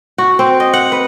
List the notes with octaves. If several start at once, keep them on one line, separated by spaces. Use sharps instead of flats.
F#4
C4
D#5
F#5
B4